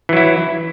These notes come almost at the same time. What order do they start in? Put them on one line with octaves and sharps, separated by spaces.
E3 F#3 E4